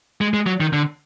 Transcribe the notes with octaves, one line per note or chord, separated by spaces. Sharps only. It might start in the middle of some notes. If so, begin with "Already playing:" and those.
G#3
G#3
F#3
D#3
D3